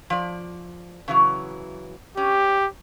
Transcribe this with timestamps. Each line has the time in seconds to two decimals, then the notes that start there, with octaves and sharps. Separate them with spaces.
0.10 F3 D5
1.08 C#3 E3 F#3
2.17 C#4 G4